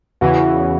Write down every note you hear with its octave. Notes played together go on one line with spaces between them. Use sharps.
E2 C#3 E3 F#4